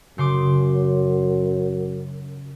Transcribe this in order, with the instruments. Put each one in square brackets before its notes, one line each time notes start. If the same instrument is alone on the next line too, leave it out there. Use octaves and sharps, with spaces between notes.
[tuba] F#2 [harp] C#3 C6 D6